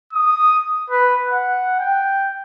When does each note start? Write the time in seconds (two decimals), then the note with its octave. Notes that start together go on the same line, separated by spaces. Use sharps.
0.13 D#6
0.90 B4
1.29 F#5
1.80 G5